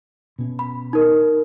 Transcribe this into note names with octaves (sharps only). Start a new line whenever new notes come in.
B2 C#4
B5
D#4 A#4